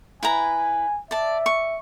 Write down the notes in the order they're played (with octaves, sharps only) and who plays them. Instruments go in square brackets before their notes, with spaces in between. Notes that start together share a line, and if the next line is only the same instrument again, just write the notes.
[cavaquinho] E4 B4 A#5 [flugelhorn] G#5
[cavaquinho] D5 A5 [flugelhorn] E5
[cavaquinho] C#6